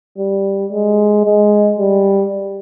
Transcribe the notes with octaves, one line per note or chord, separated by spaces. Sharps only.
G3
G#3
G#3
G3